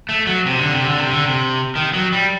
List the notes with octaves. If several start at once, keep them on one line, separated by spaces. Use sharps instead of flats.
A3
F#3
C3
D3
C3
D3
C3
D3
C3
D#3
F#3
G3